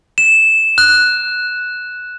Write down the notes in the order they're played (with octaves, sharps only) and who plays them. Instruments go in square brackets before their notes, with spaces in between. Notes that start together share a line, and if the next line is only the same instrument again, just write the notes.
[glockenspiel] E7
F#6